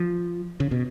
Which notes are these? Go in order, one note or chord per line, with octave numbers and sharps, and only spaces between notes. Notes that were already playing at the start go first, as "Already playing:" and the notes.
Already playing: F3
C#3
B2